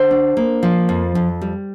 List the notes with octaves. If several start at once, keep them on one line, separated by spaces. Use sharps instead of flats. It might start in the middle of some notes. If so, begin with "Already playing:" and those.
Already playing: D3 C5
D4
A#3
F3
F2
F2
G3